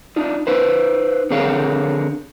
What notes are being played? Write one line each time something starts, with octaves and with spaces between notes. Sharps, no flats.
D4 D#4 F4
D#4 B4 C5
D3 C4 G#4 A#4 C#5 F5